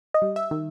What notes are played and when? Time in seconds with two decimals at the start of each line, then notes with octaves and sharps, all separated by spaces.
0.14 D#5
0.22 G3
0.36 E5
0.51 D#3